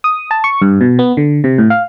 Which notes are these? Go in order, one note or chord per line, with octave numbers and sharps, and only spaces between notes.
D#6
A5
C#6
G2
B2
B3
D3
C3
A2
F5